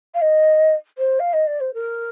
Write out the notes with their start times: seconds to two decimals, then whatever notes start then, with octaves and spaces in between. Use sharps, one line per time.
0.14 F5
0.21 D#5
0.98 C5
1.19 F5
1.33 D#5
1.47 D5
1.60 C5
1.74 A#4